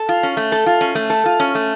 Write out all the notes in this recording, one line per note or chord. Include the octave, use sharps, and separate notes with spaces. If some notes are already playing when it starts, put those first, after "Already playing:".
Already playing: A4
F4
C#4
A3
A4
F4
C#4
A3
A4
F4
C#4
A3